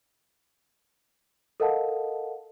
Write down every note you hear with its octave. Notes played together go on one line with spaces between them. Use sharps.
A4 A#4 D#5 F5 F#5 A5